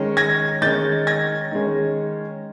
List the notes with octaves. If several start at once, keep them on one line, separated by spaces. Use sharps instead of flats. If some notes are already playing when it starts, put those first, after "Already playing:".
Already playing: D#3 G#3 C#4
G#6 A#6
D#3 G#3 C#4 G6 A6
G#6 A#6
D#3 G#3 C#4